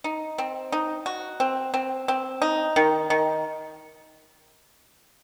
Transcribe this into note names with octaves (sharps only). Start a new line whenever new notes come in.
D#4
C4
D#4
F#4
C4
C4
C4
D#4
D#3
D#3